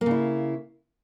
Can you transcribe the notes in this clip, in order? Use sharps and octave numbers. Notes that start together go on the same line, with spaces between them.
C#3 A#3 E4